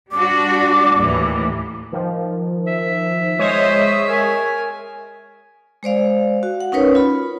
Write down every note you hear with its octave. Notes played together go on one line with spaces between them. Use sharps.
G3 D4 F#4 D6
D#2 A2 E3
D#3 F3
E5
G#3 C5 C#5 D#5 D#6
A#4 G#5
G#3 C5 D5 F5
F#4
F#5
C#4 D#4 A#4 B4 C#5
F4 B5